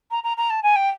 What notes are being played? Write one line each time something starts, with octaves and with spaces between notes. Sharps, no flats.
A#5
A#5
A#5
A5
G#5
G5